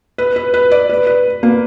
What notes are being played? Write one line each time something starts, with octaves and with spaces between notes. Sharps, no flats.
B4
B4
B4
D5
B4
B4
A#3